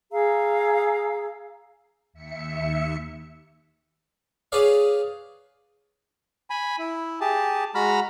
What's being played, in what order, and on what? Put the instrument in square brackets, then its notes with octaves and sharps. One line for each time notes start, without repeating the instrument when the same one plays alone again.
[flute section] G#4 F5 A#5 E6
[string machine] D#2 E5 C#7
[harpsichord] G#4 B4 C#5 D5 F5
[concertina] G#5 B5
E4
G4 G#4 A5
G#3 F#4 A#5 B5 F6